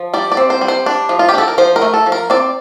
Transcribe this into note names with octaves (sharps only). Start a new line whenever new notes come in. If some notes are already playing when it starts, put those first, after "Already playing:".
Already playing: F3
G3 D5
D5
C4
C5
G3
C5
D4
F3
F4
G4
D4 A4
A#4
F3 C5
A#4
A3
A4
F3
A#4
C4 D5